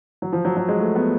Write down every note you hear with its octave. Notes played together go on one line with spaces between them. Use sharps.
F#3
F3
F#3
F#3
G#3
A3
B3